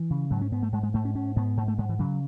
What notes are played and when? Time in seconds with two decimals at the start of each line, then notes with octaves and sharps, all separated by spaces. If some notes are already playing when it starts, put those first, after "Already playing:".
Already playing: E3
0.10 C#3
0.31 G#2 F#3
0.41 C#4
0.51 G#2 B3
0.63 A3
0.72 G#2 G#3
0.83 G#3
0.94 G#2 A3
1.05 C#4
1.15 G#2 C#4
1.36 G#2 B3
1.57 G#2 A3
1.68 A3
1.78 G#2 G#3
1.89 E3
1.99 C#3 F#3